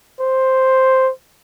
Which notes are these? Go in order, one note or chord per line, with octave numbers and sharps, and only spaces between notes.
C5